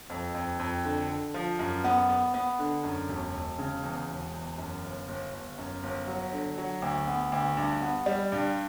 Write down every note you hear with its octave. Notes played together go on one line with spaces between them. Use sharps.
F2
F2
F2
D3
D3
F3
F#2
B3
B3
B3
D3
F#2
E1
E1
C#3
E2
E1
E2
F#2
G1
G1
G1
F#2
G1
F#3
D3
F#3
D2
B3
D2
G2
B3
G3
G2